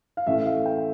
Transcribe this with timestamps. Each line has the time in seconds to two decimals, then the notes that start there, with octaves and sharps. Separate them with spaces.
0.17 F5
0.26 A1 A2 E3 A3 E5
0.46 F5
0.66 G5